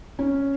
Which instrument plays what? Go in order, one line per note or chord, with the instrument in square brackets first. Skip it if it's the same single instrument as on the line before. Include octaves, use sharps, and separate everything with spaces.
[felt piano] C#4